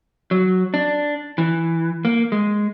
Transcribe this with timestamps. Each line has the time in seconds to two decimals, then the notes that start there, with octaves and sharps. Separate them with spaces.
0.31 F#3
0.74 D4
1.38 E3
2.05 A#3
2.32 G#3